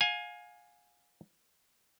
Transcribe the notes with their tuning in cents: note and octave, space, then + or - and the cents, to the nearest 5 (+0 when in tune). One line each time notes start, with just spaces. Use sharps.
F5 +30 G#5 +0